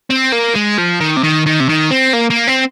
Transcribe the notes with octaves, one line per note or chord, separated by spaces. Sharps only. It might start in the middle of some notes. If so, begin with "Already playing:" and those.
C4
A#3
G#3
F3
D#3
C3
D#3
D#3
C3
D#3
C4
A#3
A#3
C4